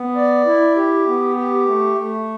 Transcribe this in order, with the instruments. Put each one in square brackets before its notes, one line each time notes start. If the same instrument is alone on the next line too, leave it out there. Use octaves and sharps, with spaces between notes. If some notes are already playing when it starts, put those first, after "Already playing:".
Already playing: [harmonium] B3
D5
E4
G4
B3
G4
A3
A3